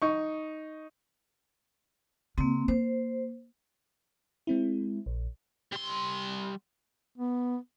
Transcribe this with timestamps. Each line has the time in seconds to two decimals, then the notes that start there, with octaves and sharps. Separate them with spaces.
0.02 D#4 C#6
2.38 C#3 A#3 C4 D4
2.68 A#3 C5
4.47 G#3 C4 E4
5.06 A#1
5.73 G3 C6
7.18 B3